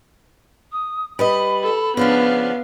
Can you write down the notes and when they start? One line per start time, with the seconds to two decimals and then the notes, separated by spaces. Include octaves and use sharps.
0.72 D#6
1.19 G3 B4 D#5 B5
1.63 A4
1.97 C#3 F3 B3 D4 F5